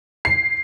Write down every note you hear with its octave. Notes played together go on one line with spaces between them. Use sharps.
C7